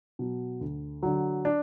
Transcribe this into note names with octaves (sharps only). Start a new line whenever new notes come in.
B2 F#3
D2
D3 F#3
D4